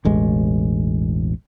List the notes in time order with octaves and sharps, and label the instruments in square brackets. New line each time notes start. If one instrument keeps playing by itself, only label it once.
[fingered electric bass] E1 A1 G#3